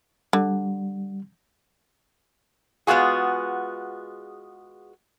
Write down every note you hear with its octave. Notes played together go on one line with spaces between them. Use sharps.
D3 G3
G#3 B3 C4 F4 F#4 G#4